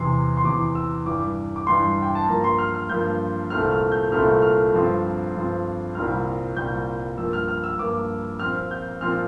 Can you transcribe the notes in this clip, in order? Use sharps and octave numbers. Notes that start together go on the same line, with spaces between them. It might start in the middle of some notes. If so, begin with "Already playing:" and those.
Already playing: E2 C3 E3 C6
C6
E2 C3 E3 D6
E6
G2 E3 G3 D6
D6
G2 E3 G3 C6
G5
A5
G2 F3 A#3 A#5
C6
F6
F6
G2 F3 A#3 G6
C2 A#2 A3 C4 F6
F6
G6
C2 A#2 A3 C4 F6
F6
G2 F3 C4
G2 F3 C4
C2 A#2 G3 C4 F6
C2 A#2 G3 C4 G6
G2 F3 A#3 E6
F6
F6
E6
G2 F3 A#3 D6
A#2 F3 C4 F6
G6
A#2 F3 C4 F6